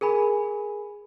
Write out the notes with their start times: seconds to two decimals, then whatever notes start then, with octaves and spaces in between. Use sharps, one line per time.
0.01 G#4 A#4 G#5 B5